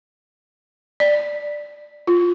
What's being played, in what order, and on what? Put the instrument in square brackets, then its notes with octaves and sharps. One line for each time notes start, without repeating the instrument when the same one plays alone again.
[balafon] D5
F4